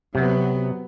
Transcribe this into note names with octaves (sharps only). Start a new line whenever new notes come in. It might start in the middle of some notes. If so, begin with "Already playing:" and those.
C3 F#3 B3